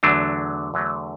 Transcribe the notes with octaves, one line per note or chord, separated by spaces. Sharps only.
E2 D3 F#3 A3 D4
E2 D3 F#3 A3